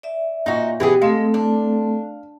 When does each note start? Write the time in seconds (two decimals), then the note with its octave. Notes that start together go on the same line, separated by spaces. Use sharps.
0.03 D5 E5
0.46 A#2 D#4 F#4
0.80 B2 E3 B3 G4 G#4
1.02 G#3 A3 C4 A4 F5
1.34 D4